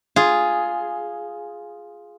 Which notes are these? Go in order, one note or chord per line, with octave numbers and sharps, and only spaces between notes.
F4 G#4